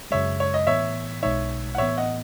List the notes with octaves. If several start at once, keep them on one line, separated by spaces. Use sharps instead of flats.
F#2 C#3 G#3 C#5 E5
C#5
D#5
A2 E3 B3 C#5 E5
B1 B2 G#3 D#4 C#5 E5
F#5
A2 E3 B3 C#5 E5
D#5 F#5